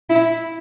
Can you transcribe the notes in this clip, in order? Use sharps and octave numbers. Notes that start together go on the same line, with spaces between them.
E4